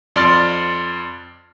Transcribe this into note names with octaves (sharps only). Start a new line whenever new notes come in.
F2 D5 C6 F6 A6